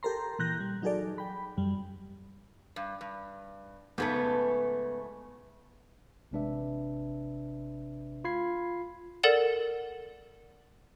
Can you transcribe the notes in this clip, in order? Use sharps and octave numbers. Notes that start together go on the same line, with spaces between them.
G4 A4 A#4 A#5 C6
A#2 E3 F#6 G6 A#6
G3
F#3 D#4 F#4 G#4 A4 D5
G5 B5
F#2 G3
G2
G2
G#2 C#3 A3 B3 B4
A1 C3 G#3 D4 B4 E5
F4 B5 G#6 C7
A4 A#4 D5 F#5 A6 E7